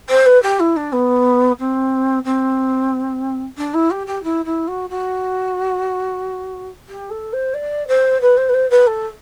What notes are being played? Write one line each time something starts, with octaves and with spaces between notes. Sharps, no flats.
C5
B4
G4
E4
D4
B3
C4
C4
D4
E4
G4
G4
E4
E4
F#4
F#4
G4
A4
C5
D5
C5
B4
C5
B4
C5
B4
A4